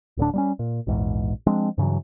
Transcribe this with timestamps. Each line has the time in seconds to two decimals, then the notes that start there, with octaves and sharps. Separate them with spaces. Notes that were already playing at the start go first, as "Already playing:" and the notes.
0.17 D1 A2 D3 D4
0.34 G3 A#3 C#4
0.59 A#2
0.87 A#1 E2 G#2
1.47 F3 G#3 C4 D4
1.78 G2 C#3 E3 F#3